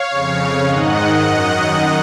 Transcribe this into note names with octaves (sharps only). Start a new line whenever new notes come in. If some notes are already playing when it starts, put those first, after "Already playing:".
Already playing: C#5 F5
F2 C#3
G#2 D#3 D#5 F#5
F#2 D#3